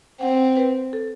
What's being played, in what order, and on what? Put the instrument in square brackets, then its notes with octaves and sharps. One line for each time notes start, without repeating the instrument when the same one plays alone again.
[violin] C4 [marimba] F#5
[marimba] B4
A4